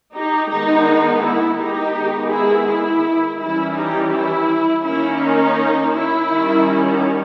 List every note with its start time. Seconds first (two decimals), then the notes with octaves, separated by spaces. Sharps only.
0.14 D#4 G4
0.50 D#3 G#3 B3 D#4
1.22 E4
1.58 D#4 G4
1.95 D#3 G#3 B3
2.31 E4 G#4
2.67 E4
3.39 E3 G3 C#4 E4
3.75 D#4 G4
4.12 E4
4.83 D#3 A#3 C#4 E4
5.20 D#4
5.92 E4
6.28 D#3 G3 C#4